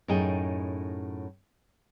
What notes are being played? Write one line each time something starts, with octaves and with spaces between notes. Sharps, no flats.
F#2 A2 D#4 G#4 G5